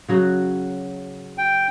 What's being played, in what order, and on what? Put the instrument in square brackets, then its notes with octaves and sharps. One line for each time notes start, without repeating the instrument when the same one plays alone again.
[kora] C#3 F#3 F#4
[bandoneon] G5